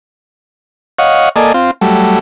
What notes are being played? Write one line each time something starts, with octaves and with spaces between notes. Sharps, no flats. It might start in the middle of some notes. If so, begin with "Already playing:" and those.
C#5 D#5 F5 F#5 C#6
A#3 A4 D5 D#5 G#5
C4 F4
F#3 G3 A3